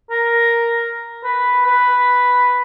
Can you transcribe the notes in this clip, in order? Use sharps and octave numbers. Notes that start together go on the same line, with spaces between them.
A#4
B4
B4